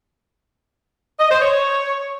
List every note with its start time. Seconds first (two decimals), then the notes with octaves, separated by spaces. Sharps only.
1.20 D#5
1.30 C5
1.40 C#5